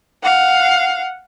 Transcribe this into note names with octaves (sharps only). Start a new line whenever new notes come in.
F5 F#5